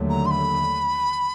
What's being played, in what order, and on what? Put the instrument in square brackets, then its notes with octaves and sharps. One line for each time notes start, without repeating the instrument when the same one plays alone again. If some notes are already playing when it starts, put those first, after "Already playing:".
Already playing: [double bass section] D#2 D3 F#3 A3
[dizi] A#5
C6
B5